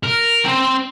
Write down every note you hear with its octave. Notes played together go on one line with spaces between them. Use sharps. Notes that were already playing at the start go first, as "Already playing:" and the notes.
A#4
C4 C5